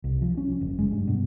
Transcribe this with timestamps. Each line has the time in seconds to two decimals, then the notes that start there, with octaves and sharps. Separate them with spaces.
0.04 C2
0.22 F3
0.37 C#4
0.61 F#1
0.78 G#3
0.92 G2
1.07 B2